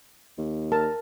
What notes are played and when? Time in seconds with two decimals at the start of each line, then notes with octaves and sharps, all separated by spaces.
0.38 D#2
0.72 A#4 A5